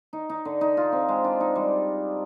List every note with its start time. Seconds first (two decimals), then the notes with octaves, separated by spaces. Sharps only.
0.13 D#4
0.29 D#4
0.45 D3
0.61 D#4
0.77 F4
0.92 C4
1.09 G#3
1.24 D4
1.40 D#4
1.56 G3